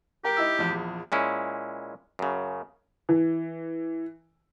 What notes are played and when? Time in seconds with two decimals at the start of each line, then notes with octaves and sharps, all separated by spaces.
0.24 G4 A#4 G5
0.37 D#4 E4 E6
0.58 A#1 E2
1.12 A#2 G#3 C#4 E4
2.19 F#2 C#3
3.09 E3